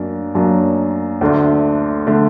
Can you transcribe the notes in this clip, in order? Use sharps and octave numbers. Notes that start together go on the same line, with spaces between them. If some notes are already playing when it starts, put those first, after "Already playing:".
Already playing: F#2 F#3 A#3 D4
F#2 F#3 A#3 D4
D2 D3 A3 D4
D3 A3 D4